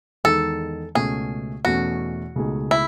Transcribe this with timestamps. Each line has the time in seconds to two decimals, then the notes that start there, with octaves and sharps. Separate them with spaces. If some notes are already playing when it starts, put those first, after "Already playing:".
0.24 E2 D#3 G#3 D#4 A4
0.95 C#2 B2 A3 C#4 F#4 G#4
1.65 E2 B2 A3 C#4 F#4
2.36 C#2 B2 A3 D#4 G#4
2.71 E4